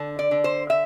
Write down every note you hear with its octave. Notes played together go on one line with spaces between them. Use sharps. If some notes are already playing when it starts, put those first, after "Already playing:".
Already playing: D3
D5
D3
C5
E5